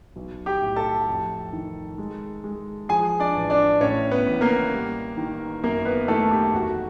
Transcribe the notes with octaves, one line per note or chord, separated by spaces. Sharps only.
B1
G4 G5
A2
A4 A5
F2
D#3
G#3
G#3
F3 G#4 G#5
D4 D5
A1
D4 D5
A2 C#4 C#5
B3 B4
A1
A#3 A#4
G3
D#3
F#2 A#3 A#4
B3 B4
D#3 A3 A4
G4
E1 F#4